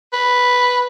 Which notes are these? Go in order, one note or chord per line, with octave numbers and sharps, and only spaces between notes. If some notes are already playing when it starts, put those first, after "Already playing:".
B4